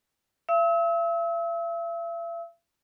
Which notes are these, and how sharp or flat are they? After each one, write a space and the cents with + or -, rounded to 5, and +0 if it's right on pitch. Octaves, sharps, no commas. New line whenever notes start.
E5 +45 E6 -35